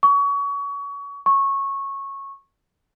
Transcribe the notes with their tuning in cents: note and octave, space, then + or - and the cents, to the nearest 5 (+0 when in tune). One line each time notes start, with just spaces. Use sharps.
C#6 +30
C#6 -15